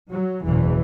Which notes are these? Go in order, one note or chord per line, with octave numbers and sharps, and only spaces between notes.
F#3
F#1 E2 B2 E3